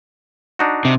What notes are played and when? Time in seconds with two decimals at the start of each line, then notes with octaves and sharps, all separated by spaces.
0.59 D4 D#4 F#4
0.85 C3